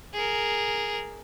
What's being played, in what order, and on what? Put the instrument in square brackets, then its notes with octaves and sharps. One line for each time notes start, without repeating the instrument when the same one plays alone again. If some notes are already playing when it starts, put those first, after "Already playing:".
[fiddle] G#4 A#4